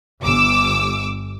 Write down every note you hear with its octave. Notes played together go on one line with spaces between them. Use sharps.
G1 D6 E6